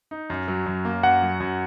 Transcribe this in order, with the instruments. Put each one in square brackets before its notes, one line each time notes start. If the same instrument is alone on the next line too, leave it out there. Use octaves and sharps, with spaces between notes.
[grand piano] D#4
F#2
F#3
F#2
A#3
[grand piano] F#2 [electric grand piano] F#5
[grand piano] F#3
F#2